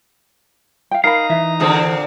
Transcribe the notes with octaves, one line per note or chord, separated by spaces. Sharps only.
F5 G5
D#4 A#4 F5 A#5 B5
E3 E5
A#2 D3 C4 G#4 A4 C5